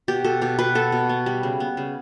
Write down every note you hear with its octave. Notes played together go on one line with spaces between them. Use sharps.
B2 G4
B2 A4
B2 G4
B2 B4
B3 A4
B2
B3
G3
C#3
B3
C#3